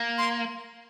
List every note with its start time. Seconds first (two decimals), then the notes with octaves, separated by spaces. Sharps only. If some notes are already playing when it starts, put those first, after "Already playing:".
Already playing: A#3
0.18 C6